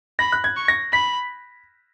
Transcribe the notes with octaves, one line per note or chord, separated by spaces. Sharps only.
B5 A#6
F#6
G#6
C#6
A#6
B5 B6